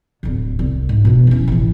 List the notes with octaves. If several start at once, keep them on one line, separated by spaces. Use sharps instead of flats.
D1 D3
C2
G#2
B2 D4
E3 C#4
A1 E3